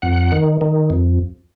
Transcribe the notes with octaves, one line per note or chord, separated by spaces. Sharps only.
F2 F#5
D#3
D#3
F2